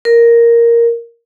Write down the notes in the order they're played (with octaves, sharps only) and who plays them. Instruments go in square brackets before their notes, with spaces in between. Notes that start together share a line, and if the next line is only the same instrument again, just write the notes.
[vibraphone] A#4